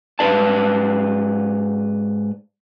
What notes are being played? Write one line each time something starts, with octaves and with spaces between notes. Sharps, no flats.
G#2 B4 D5 A5